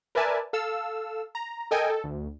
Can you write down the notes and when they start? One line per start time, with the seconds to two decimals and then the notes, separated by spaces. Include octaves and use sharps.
0.15 A#4 B4 D5 E5 G#5 A5
0.53 A4 F5 E6
1.35 A#5
1.71 A4 A#4 D#5 G5 G#5
1.90 A4
2.04 D2